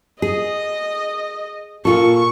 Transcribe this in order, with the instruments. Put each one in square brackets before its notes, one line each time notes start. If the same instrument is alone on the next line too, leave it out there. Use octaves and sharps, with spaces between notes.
[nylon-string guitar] G#4 [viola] D#5
[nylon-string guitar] A#2 F4 A4 [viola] C#6